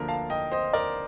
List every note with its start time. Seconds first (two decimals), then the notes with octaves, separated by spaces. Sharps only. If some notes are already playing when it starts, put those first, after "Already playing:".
Already playing: D2 D3 F3 A#3 D4 A#4
0.08 F5 A5
0.30 D#5 G5
0.52 C5 D#5
0.73 A#4 D5